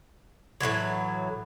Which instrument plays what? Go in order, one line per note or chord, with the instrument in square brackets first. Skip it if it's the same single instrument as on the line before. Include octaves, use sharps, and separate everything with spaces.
[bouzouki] A2 C#3 E3 F#3